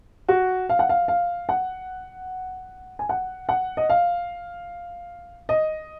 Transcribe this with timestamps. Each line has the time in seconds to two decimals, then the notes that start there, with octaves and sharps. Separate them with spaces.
0.29 F#4
0.69 F5
0.79 F#5
0.89 F5
1.08 F5
1.49 F#5
2.99 G#5
3.09 F#5
3.49 F#5
3.77 D#5
3.89 F5
5.49 D#5